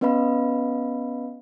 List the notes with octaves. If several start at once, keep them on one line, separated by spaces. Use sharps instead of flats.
B3 C#4 B4 D#5 F5 B5